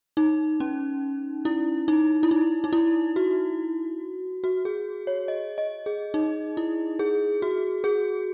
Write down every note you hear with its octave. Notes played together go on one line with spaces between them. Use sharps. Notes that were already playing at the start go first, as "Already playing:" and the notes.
D#4
C#4
E4
D#4
E4
D#4
D#4
E4
F#4
F#4
G#4
C#5
D#5
D#5
G#4
D#4
E4
G#4
F#4
G#4